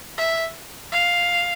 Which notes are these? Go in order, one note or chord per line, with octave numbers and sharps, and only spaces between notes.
E5
F5